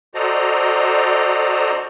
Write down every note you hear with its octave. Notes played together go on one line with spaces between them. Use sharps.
F#4 A4 C5 D5 D#5 A#5